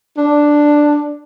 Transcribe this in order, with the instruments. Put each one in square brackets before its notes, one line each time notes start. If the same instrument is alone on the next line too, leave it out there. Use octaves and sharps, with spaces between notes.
[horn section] D4